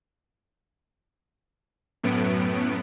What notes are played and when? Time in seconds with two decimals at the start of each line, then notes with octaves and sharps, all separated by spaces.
2.03 F#2 A2 B3 D7